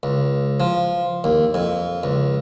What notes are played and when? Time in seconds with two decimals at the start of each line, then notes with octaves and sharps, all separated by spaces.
0.03 C#2
0.60 F3
1.24 D#2
1.54 F2
2.03 C#2